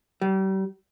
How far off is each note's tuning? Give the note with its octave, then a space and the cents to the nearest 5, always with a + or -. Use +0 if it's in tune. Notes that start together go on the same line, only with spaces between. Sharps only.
G3 -35